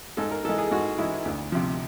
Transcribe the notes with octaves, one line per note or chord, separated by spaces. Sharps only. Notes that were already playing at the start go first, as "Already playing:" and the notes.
G#2 A4
A#4
E3 G#3 A4
G#4
G#2 F#4
E3 G#3 E4
D2
C3 F3